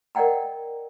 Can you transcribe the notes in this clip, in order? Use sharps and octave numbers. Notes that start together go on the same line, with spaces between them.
A#4 D5 D#5 F#5 G5 A#5